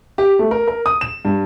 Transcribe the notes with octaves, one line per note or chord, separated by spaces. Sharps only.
G4
A3
A#4
A#4
D#6
E7
G2